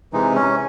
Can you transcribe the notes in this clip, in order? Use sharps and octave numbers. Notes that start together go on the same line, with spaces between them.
C3 E3 G#3 D#4
C#4